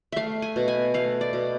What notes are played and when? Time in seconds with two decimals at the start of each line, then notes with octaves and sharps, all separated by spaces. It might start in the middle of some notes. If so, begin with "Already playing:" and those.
0.12 A3 E5 F5
0.42 G#5
0.56 B2
0.68 G#5
0.94 A3 F5
1.21 D5
1.33 B2